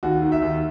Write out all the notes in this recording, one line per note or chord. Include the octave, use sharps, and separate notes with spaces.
D#2 F#4
D#3
E5
D#2